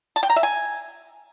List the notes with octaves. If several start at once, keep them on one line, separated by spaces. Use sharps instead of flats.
A5
G5
A#5
E5
G#5